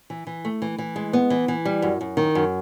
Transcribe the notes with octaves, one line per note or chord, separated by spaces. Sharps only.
E3
E3
A3
E3
E3
G#3
B3
E3
E3
G3
F#2
F#2
D#3
F#2